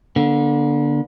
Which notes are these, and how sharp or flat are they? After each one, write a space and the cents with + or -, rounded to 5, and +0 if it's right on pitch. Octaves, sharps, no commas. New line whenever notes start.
D3 +0 B3 -45